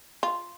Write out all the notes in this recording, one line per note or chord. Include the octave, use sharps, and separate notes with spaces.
F4